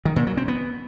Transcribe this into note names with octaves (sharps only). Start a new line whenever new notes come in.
D#3
A#2
F#3
C4
B3